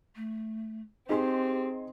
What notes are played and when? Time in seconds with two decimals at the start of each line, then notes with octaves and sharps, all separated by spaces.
0.16 A3
1.09 C4 D#4 G4 G#4 C6